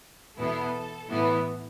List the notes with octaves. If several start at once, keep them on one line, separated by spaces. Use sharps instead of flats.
E2 B2 B3 E4 A4
A2 E3 B3 E4